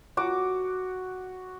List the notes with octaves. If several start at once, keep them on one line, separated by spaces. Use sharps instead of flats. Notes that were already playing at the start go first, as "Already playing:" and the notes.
F#4 D6